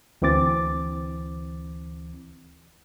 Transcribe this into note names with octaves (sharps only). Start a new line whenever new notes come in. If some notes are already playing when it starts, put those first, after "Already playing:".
D2 E3 C4 D6 A6